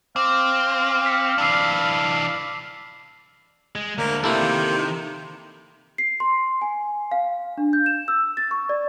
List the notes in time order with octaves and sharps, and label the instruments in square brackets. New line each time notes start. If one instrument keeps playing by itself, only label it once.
[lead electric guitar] C4 [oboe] F5 [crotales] D6
[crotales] B6 C#7
[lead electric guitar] E3 D4 [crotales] D6 E6 C7
[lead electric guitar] G#3
[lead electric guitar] D2 [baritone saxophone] A#3
[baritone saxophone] C3 [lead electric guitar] A3 D4 [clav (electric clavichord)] A#3 E4 A4
[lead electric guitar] D#3
[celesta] C7
C6
G#5
F5
D4
G6
E7
E6
A6
C#6
D5